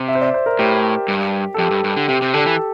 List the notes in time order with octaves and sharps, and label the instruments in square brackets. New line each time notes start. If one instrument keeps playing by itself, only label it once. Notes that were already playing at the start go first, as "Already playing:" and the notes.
Already playing: [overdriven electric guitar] C3
[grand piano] E5
C5
D5
C5
A#4
[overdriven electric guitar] A2 [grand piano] G4
[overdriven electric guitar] G2
[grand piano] A4
[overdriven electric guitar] F2 [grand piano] G4
[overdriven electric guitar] G2
G2
D3
[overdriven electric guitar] C3 [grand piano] G4
[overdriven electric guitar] C3
[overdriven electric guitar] D3 [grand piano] A4
[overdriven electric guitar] E3